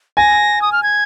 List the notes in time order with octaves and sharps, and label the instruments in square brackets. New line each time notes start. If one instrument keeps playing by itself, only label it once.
[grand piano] G#5 [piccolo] A#6
[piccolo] D#6
F6
G#6